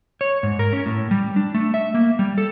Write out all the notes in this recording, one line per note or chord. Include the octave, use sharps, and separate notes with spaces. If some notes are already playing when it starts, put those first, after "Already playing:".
C#5
G#2
A#4
C#4
A2
G3
D4
A3
E5
A#3
G3
A4